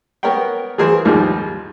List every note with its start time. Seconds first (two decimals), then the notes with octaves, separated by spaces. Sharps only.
0.23 B3 A#4 C#5 F#5 G5
0.78 E3 F#3 G#4 A#4 C5
1.05 D#2 G#2 F3 G3